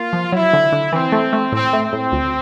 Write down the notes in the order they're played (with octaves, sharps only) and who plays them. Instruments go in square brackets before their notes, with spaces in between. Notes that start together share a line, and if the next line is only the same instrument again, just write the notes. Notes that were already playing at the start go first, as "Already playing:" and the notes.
Already playing: [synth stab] A#3 [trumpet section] F4
[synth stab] F3
[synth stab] F#3 [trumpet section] E4
[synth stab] D3
D3
[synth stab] E3 [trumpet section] C4
[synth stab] A3
A3
[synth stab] A2 [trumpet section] C4
[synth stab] A3
[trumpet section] C4
[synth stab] A2
D2